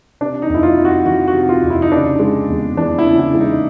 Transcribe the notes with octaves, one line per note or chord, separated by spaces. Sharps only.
C3 D4
D#4
F2
E4
F4
F2
F#4
E3 F#4
F#4
C3
F4
F2
E4
D#4
C#3 D4
G#3
E2
E3 D4
E4
C#3
E4
G#3
D#4